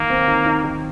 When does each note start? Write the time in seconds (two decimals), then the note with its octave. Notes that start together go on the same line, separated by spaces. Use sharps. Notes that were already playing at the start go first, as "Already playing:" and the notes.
Already playing: D#3 A#3 D#4
0.10 C4
0.28 D#3
0.46 D#4
0.64 D#3